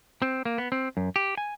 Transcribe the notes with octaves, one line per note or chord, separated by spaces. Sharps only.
C4
A#3
B3
C4
F#2
G4
G#5